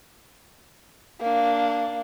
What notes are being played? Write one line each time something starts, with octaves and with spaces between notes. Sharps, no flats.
A#3 D4